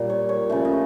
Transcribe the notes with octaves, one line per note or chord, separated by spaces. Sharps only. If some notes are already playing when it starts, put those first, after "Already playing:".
Already playing: A#2 G3
C#5
C#5
C#3 F3 A3 D5
D#5